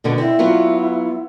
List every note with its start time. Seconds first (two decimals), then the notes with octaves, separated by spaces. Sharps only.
0.04 B2 D3 B3
0.18 C4 E4
0.39 F#3 B3 F4